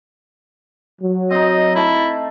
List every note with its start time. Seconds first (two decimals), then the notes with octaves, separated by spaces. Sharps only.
1.00 F#3
1.31 C4 D#4 D#5
1.75 A3 E4 A5